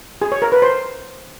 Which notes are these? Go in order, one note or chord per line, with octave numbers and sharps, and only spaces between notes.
G#4
C#5
A#4
B4
C5